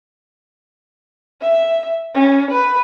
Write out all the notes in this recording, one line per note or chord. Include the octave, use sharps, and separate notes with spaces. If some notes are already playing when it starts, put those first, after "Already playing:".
E5
C#4
B4